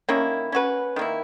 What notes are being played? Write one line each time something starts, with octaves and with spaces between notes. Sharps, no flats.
D#3 A#3 C#4 E4
C#4 F#4 B4
D#3 A#3 E4